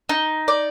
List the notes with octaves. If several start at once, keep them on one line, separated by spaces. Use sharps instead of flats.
D#4
D5